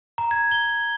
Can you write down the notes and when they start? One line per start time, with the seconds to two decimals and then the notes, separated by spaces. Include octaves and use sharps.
0.18 A#5
0.31 G#6
0.52 G7